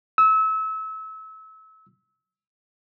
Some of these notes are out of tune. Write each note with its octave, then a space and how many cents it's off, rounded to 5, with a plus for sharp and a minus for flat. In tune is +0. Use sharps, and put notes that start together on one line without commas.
E6 -30